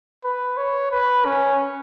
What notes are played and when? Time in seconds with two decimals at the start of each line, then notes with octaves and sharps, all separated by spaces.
0.24 B4
0.57 C#5
0.91 B4
1.25 C#4